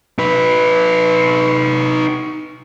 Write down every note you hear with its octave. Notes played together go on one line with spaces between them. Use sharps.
D#4 B4